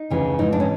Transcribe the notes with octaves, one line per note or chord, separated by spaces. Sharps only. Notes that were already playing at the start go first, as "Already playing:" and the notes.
Already playing: D#4
D2 C#3 E3
G#2 E3 D#4
D4
C#4